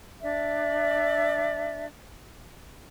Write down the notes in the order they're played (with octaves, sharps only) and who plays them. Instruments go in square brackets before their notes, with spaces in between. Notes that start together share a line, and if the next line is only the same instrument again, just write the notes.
[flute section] D4 D5 E5